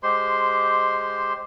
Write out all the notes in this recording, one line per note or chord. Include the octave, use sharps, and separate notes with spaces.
G#3 G4 C5 C6